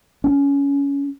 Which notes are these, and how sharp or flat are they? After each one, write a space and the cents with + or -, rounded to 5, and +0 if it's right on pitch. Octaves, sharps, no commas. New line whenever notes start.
C#4 +20